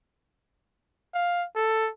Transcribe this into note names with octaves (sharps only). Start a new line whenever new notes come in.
F5
A4